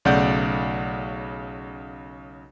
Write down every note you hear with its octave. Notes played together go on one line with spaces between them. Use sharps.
B1 C#3 A3 D5 F#5 G6